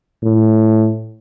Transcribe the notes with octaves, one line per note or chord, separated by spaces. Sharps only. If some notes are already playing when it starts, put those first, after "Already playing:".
A2